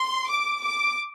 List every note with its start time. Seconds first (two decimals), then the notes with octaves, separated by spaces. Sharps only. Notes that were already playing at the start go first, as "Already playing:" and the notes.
Already playing: C6
0.30 D6
0.62 D6